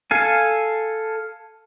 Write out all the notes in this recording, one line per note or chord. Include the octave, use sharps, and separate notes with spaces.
A4 F5 G#5